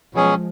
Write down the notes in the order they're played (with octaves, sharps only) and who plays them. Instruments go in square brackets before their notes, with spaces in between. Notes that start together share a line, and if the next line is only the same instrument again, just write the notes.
[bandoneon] B2 F#3 C#4 G#4 [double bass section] F3 G#3